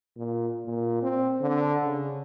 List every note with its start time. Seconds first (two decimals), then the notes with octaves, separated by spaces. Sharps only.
0.17 A#2
0.66 A#2
1.03 C4
1.41 D3
1.84 C#3